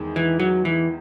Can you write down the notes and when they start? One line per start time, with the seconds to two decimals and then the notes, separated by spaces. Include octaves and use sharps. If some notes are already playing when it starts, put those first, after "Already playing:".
Already playing: E2 D#3 G#3 D#4
0.16 E3
0.40 F#3
0.65 E3